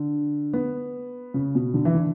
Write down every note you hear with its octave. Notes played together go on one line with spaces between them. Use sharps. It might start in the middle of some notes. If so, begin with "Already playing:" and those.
Already playing: D3
B3
C#3
B2
D3
E3
D3